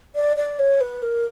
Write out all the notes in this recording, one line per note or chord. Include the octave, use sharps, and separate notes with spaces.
D5
D5
C#5
B4
A#4